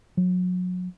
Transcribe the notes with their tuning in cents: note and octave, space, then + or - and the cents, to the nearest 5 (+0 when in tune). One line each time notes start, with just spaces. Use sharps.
F#3 -30